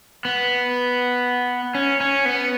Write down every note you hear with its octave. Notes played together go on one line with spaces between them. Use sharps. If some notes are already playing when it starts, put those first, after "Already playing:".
B3
C#4
C#4
B3